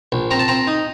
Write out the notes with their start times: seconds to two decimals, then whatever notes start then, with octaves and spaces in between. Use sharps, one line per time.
0.12 A#1
0.31 C4 A#5
0.39 A5
0.48 C4 A#5
0.67 D#4